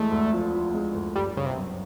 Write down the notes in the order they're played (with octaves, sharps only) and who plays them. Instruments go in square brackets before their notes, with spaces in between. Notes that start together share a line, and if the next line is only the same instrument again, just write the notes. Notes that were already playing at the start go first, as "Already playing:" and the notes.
Already playing: [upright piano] E2 G#3 [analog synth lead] A3
[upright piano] D2
F3
F3
G#3
D2
[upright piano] G1 [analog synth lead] G3
[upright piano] G1 [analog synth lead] C#3
[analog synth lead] C3
[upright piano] F#2